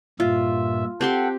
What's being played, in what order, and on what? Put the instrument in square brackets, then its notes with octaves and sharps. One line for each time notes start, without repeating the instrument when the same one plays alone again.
[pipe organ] G2 A#2 E5 [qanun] F4
[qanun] C4 G4 C6 [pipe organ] A4 F#5 G5